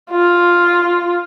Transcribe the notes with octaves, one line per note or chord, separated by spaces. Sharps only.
F4